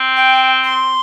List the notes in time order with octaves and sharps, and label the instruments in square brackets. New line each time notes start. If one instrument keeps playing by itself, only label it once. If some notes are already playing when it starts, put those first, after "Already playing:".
Already playing: [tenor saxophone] C4
[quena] G5
C6